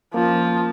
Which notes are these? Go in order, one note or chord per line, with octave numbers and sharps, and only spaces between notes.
F3 A#3 C#4 F4